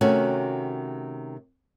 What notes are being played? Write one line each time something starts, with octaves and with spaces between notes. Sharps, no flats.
C3 D#3 A3 C#4 F#4